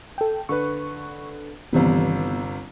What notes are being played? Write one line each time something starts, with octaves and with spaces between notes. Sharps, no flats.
A4 G5
D3 B4 C#6
G1 C3 D#3 E3 G3 B3